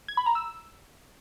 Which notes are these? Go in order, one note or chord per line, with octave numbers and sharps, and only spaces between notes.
G#6
B5
A#5
E6